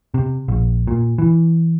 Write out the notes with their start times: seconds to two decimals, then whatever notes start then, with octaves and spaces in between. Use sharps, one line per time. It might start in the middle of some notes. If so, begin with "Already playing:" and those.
0.14 C3
0.48 A#1
0.87 A#2
1.18 E3